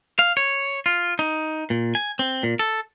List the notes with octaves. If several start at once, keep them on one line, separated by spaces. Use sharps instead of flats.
F5
C#5
F4
D#4
A#2
G#5
C4
A#2
A4